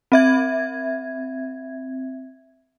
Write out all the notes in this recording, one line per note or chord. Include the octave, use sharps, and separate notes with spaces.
C4 E5 G#6